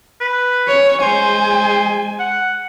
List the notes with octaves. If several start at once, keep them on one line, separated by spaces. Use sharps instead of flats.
B4
C#4 C#5
G#3 C5 G#5
F#5